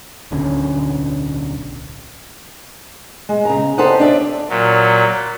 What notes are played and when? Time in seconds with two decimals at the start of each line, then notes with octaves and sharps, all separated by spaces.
0.31 D1 B1 D3 C#4
3.29 G#3
3.45 C#3 A#5
3.78 G4 A4 C5 D5 D#5 F#5
4.00 D4 D5 E5
4.49 A#2 F#3